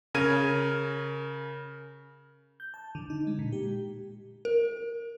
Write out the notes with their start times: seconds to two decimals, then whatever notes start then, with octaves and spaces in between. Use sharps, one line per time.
0.14 C#3 A#4 F6 G#6 D#7
2.60 G6
2.74 A5
2.95 D3
3.10 D#4
3.27 G#3
3.39 A#2
3.53 G4
4.45 A#4